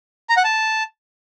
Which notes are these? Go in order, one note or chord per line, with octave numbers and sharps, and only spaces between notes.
A#5
F#5
A5